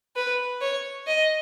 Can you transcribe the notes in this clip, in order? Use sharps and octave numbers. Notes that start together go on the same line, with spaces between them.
B4
C#5
D#5